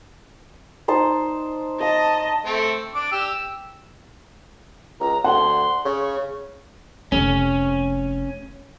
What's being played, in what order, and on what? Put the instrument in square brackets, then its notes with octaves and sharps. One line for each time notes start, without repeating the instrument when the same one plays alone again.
[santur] D#4 C5 A5
[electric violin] D#5 [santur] F5 [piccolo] A5
[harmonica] A3 C4
D4 D6
G4 E6
[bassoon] C#2 [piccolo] A#5
[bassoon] D2 [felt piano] F#5 [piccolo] C6
[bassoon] C#3 [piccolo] C#6
[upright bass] F1 [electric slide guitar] C#4